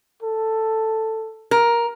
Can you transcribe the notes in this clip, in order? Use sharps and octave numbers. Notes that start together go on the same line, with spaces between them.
A4
A#4